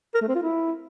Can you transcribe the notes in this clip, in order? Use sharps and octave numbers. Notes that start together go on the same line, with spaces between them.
A#4
A3
C4
F4
E4